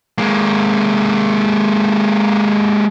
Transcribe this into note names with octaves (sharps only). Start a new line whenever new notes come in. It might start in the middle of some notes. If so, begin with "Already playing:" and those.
G#3 A#3